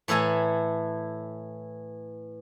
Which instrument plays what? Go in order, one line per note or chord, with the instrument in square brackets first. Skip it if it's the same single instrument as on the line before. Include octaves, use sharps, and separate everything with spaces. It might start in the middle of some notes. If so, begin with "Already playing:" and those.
[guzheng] A2 E3 E4 A4 G#5 A#5